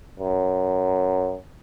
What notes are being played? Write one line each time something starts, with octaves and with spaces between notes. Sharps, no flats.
F#2